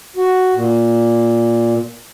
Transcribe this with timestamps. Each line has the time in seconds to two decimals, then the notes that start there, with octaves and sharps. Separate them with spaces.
0.16 F#4
0.54 A#2